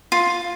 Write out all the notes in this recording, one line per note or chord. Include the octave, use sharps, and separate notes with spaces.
F4